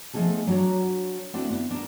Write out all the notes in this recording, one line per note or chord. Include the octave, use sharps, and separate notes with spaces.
F3 A3 B3 D#4 G#4 A4
F#3 D4 F#4 C#5 A#5
A3 C4 D4 E4 F#4
B3 E4
D4 A#4